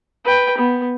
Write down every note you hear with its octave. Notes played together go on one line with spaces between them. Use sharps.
B4 G5
B3